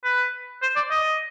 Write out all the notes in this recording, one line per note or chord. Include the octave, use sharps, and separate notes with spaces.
B4
C5
D5
D#5